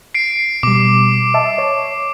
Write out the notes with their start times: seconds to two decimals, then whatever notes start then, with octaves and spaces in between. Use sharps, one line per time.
0.14 C7 D7
0.63 B2 G3 D6
1.34 D#5 E5 A5
1.58 C#5